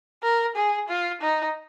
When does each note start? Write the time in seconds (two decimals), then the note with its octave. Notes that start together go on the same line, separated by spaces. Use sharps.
0.23 A#4
0.56 G#4
0.88 F4
1.21 D#4